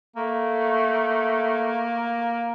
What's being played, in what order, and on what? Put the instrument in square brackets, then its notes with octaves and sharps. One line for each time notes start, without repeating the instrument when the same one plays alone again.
[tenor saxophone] A3 [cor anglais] A#3